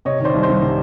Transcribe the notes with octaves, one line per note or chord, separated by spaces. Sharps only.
C3 C#5 D#5
D#3 C5 D5
C2
C5
C2
C3